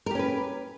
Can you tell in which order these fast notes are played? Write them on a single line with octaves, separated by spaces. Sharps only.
A#4 G4 C#4 B4